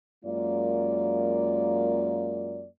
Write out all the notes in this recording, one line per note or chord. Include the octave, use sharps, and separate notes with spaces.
F#2 G#3 A#3 F4 D5